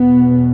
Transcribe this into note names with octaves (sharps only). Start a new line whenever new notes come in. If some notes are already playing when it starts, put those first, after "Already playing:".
Already playing: E2 B2 B3